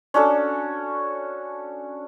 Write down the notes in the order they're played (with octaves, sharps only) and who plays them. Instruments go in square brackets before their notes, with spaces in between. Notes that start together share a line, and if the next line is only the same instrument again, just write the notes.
[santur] C#4 D4 F#4 A4